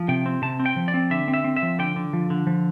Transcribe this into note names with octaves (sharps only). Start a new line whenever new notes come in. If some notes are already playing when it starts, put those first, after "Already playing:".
Already playing: F3
C3 G5
C4
C3 A5
C4
G5
F3
D5
C4
D3 E5
C4
E5
C4
E5
F3
D3 G5
D3
F3
D3
F3